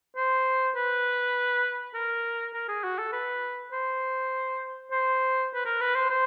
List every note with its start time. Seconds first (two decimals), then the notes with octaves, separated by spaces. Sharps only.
0.17 C5
0.76 B4
1.94 A#4
2.54 A#4
2.68 G#4
2.84 F#4
2.99 A4
3.13 B4
3.72 C5
4.91 C5
5.55 B4
5.66 A#4
5.81 B4
5.95 C5
6.10 C5